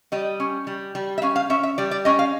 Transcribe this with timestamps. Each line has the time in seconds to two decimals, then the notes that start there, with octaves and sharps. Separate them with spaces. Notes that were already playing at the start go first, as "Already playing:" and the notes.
0.12 G3 D#5
0.40 C#4
0.67 G3
0.95 G3
1.18 E5
1.22 C#4 F5
1.36 F5
1.50 C#4 E5
1.63 E5
1.78 G3 D5
1.91 D5
2.05 C#4 D#5
2.19 F5